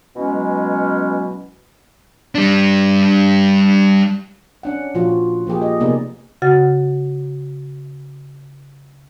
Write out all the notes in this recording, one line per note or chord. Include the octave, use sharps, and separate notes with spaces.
B2 E3 F#3 G#3 C#4
G3 D4
C#4 D4 F#5
A#2 F3 F4 F#4
F3 A#3 G4 G#4
D#5
C3 A#3 B3 D#4 G#4 D5
C#3 F#4 F#5 A6